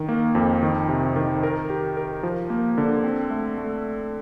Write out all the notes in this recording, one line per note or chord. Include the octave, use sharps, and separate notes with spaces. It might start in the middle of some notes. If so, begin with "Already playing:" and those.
Already playing: D#3
A#3
F2
D#3
C3
D#3
A#4
G4
A#4
F3
A#3
D3
C4
A3
A3